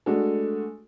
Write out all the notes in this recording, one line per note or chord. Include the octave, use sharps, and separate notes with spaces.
G#3 A3 D4 F#4 A4